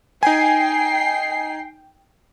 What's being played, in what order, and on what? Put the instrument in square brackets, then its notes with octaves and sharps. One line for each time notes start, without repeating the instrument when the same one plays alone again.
[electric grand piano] D#4 G#5 [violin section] G5 C7